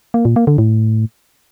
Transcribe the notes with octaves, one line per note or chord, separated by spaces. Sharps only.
A#3
A#2
A#3
D3
A2